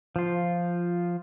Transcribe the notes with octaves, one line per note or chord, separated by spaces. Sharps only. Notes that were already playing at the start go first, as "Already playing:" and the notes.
F3 F4